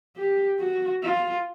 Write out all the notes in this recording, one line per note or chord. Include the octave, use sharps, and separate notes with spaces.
G4
F#4
F4